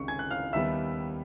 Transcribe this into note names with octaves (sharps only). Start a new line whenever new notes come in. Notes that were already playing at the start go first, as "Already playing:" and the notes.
Already playing: C#2 C3 D#3 C#6 C#7
G#5 G#6
F#6
F5 F6
D#2 D#3 G3 B3 E5 E6